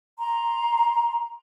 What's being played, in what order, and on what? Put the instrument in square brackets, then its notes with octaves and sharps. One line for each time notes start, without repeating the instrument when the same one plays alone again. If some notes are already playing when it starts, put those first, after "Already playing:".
[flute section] A#5 C6